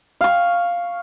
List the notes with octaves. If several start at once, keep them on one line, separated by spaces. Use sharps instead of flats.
F5 C#6